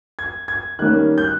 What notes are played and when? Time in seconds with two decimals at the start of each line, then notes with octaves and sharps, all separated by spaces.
0.19 G#6
0.48 G#6
0.79 D#3 G3 A#3 C#4 F#6
1.18 G6
1.24 F#6